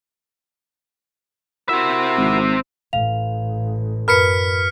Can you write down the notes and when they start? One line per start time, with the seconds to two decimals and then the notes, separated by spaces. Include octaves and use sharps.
1.69 C4 E4 F#4 A#4 E5
2.17 G#1
2.93 A1 F5 F7
4.08 F#2 A#4 B4 B5 F6 B6 C#7